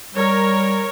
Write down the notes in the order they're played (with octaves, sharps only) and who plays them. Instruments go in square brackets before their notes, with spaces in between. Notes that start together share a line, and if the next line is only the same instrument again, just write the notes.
[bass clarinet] G3 [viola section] A#4 C#5